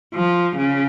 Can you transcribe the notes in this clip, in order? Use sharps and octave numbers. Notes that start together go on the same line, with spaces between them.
F3
C#3